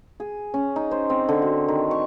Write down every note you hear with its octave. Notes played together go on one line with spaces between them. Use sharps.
G#4
C#4
D#4
C5
C4
D3
F#4
D#3
C#6